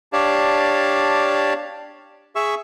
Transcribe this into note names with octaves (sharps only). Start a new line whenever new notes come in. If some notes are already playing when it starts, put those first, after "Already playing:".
D4 G4 C#5 D5 F5 A5
G#4 E5 C#6 E6